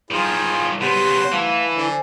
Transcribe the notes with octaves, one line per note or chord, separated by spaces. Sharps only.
D#3 F3 F4 G#4 C5
C#3 B3 F#4 G4 C5
E3 A3 F5
D3 C5 G#5